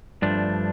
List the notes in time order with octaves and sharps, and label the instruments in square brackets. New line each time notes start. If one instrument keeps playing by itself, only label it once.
[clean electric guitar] G2 F3 A3 D4